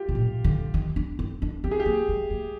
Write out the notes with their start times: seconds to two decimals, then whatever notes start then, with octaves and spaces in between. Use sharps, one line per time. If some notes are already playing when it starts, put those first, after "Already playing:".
Already playing: F4 G4
0.08 C3
0.15 A#2
0.44 D3
0.74 D#3
0.96 D4
1.19 C4
1.42 D4
1.64 C4 G4
1.71 G#4
1.80 G4
1.85 A#3
2.09 G#3
2.30 A#3